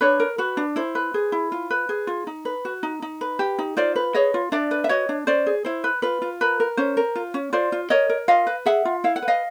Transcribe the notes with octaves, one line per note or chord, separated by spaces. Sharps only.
D4 B4 C#5
A#4
F#4 B4
D4
E4 C5
B4
G#4
E4
F4
B4
G#4
F4
D#4
B4
F#4
D#4
D#4
B4
G4
D#4
F4 C5 D5
B4
G#4 C#5 D#5
F4
D4 D5 E5
B4
E5
F#4 C#5 D#5
D4
C#4 C5 D5
G#4
E4 C5
B4
F4 B4
F4
A#4 B4
A#4
C#4 C5
A#4
F4
C#4
F4 C5 D5
F4
A#4 C#5 D#5
A#4
F4 D#5 F5
B4
G#4 E5 F#5
F4
E4 F5
F#5
B4
D#5 F5